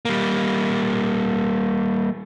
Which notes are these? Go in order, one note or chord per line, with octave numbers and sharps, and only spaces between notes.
G3 A#3